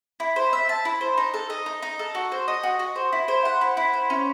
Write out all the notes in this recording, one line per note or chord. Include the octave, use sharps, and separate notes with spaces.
E4
C5
E5
A5
E4
C5
D#4
A4
D#5
D#4
D#4
A4
F#4
C5
D#5
F#4
F#4
C5
E4
C5
F#5
E4
E4
C5
C#4